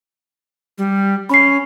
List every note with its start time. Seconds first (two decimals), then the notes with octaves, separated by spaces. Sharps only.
0.78 G3
1.29 C#4 B5 C7